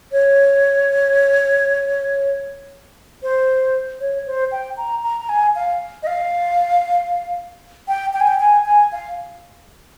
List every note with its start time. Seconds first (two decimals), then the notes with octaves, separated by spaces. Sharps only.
0.12 C#5
3.23 C5
4.00 C#5
4.26 C5
4.52 G5
4.77 A#5
5.04 A#5
5.20 A#5
5.29 G#5
5.56 F5
6.03 D#5
6.07 F5
7.88 G5
8.13 G5
8.20 G#5
8.27 G5
8.40 G#5
8.65 G#5
8.92 F5